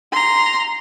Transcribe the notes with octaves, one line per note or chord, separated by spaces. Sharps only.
A#5 C6